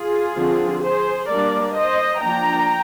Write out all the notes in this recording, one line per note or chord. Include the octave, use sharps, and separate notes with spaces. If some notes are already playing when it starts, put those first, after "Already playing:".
Already playing: F4 G#4
D3 F3 C4
G#4 C5
G3 A#3 D4 A#4 D5
C5 D#5
F3 A#3 D4 G5 A#5